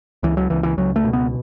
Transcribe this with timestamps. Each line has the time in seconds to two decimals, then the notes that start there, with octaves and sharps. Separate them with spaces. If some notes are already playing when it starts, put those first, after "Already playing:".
0.23 C#2 E3
0.37 F#3
0.50 C#2 E3
0.63 E3
0.77 C#2 F#3
0.96 A3
1.04 B2
1.13 B3